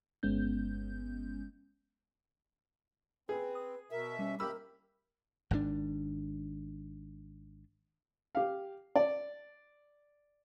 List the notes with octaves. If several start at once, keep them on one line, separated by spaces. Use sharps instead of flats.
G1 G#3 B3 C#4 G6
C4 G#4 B4
D#6
B2 A#4 E5
G3 C#4
G4 A#4 B5 E6
G#1 G#2 D#3 D4
G4 F5
D5